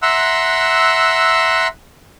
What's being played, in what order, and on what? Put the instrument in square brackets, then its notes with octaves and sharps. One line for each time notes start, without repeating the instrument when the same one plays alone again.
[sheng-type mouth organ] E5 F#5 A#5 C6 E6 F#6